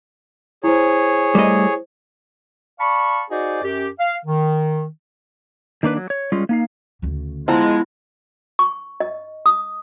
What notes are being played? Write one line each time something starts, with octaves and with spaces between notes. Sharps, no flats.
E4 G#4 C5 C#5
G3 A3 D#5
D5 F5 A5 B5 C#6
D#4 F#4 G#4 C5 D5 D#5
F#2 G4
F5
D#3
D#3 A#3 D4 B4
F#3
C#5
G3 G#3 C#4 F4
A#3 D#4 F5
D2 C#3
F3 G#3 B3 E4 A#5
C#6
D#5
D#6